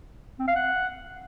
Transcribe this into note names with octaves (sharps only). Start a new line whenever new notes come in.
C4
F5
F#5